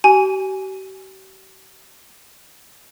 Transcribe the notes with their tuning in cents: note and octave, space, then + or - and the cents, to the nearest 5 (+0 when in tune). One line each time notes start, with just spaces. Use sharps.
G4 -45 G#5 +0